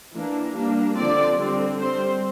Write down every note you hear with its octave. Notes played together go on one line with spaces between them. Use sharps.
E3 A#3 D4
G3 A#3 D4
D3 F3 C4 D5
D3 G3 C4
G3 C4 C5